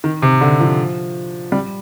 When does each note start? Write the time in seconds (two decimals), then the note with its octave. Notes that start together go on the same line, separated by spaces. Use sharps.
0.04 D#3
0.22 C3
0.41 D3
0.60 F3
1.52 G3